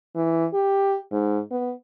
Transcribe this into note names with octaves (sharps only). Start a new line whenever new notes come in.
E3
G4
G#2
B3